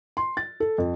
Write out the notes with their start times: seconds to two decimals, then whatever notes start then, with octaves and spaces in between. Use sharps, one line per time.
0.17 C6
0.37 A6
0.60 A4
0.78 F2